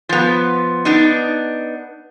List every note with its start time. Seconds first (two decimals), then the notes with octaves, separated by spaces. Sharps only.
0.09 F3 B3
0.85 B3 D4 D#4